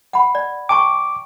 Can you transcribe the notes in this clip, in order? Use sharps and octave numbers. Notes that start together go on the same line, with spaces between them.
F#5 B5
D5
G5 A5 C#6 D6